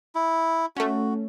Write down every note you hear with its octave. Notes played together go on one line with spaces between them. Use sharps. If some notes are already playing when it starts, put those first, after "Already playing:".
E4
A3 C#4 F#4